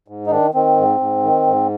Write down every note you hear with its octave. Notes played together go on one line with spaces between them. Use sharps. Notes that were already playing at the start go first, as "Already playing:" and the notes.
G#2
D#4
D#3 D4
D#3 C4
G#2
G#2
D#3
G#2